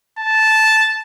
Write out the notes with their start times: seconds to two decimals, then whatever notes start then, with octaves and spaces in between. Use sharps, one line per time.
0.19 A5